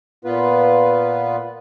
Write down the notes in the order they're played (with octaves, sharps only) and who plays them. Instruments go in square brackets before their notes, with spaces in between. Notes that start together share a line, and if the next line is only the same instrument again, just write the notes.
[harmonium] A#2 B3 F4 B4